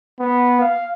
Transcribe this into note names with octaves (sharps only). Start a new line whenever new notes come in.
B3
F5